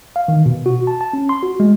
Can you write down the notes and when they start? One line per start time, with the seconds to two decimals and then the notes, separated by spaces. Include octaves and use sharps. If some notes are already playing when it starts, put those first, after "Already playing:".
0.16 F5
0.28 D#3
0.46 B2
0.66 F#4
0.87 A5
1.01 A5
1.13 C#4
1.29 C6
1.43 F#4
1.60 G#3